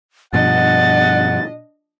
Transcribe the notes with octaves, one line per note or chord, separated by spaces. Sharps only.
G2 B2 F3 D4 D#5 F#5 A6